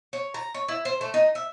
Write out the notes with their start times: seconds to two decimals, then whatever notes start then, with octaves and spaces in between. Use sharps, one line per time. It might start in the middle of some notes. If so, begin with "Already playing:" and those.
0.13 C#5
0.34 A#5
0.54 C#5
0.69 E4
0.85 C5
1.01 A3
1.14 D#4
1.35 E5